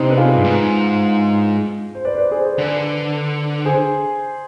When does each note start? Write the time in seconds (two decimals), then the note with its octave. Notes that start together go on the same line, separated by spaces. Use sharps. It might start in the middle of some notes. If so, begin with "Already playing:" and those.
Already playing: C3 B3 C4 D4 D#4
0.10 B4
0.17 F4 G#4
0.35 G2
0.44 G#2
1.95 C5
2.05 B4 D5
2.13 C5
2.18 B4 D5
2.31 G#4 C5
2.45 G#4 C5
2.58 D3 B4 D5
3.65 G#4 C5